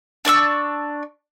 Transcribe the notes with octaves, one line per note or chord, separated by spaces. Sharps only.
D4 D5 C#6 E6